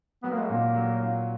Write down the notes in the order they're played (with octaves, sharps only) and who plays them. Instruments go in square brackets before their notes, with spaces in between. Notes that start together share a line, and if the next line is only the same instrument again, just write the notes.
[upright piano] F#3 [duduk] B3
[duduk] A#3
G#3
[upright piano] A#2 [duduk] A#3
[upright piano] F#3
A#2